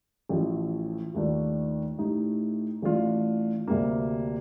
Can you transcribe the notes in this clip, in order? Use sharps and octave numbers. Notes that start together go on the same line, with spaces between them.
A1 A2 F3 A3
D#2 D#3 A3 D4 F4
A2 A3 D#4 G4
A1 A2 A3 D4 F4
D2 C3 G3 A#3